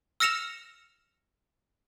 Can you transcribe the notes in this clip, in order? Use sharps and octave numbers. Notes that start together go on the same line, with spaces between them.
E6 F6 A#6 C#7 E7 F7